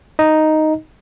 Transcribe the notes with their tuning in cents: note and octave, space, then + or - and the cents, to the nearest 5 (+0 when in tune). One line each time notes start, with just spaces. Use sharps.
D#4 +0 D#5 +0